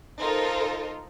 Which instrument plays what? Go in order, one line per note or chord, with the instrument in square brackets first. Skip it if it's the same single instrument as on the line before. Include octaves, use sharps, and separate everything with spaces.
[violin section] D#4 F4 A4 A#4 C5